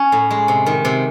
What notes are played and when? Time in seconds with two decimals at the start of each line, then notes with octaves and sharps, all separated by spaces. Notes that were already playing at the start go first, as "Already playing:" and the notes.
Already playing: C#4
0.12 A2
0.31 G#3
0.48 C3
0.66 D#3
0.85 C3